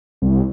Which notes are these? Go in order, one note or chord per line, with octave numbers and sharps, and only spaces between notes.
C2